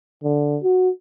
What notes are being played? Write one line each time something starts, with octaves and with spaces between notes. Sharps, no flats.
D3
F#4